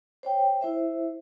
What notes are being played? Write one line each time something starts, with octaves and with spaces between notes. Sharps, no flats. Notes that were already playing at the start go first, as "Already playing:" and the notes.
C5 C#5 G5
E4 C5 E5